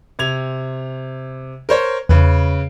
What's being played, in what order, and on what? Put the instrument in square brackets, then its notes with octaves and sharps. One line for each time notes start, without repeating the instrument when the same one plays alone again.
[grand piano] C3 G#6 F7
A#4 C5 C#5
[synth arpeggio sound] E2 [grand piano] C#3 B4